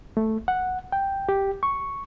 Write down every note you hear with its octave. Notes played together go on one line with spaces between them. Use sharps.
A3
F#5
G5
G4
C#6